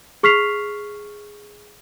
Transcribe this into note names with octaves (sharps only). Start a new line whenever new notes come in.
G#4 C#6 F6 B6 C7 F7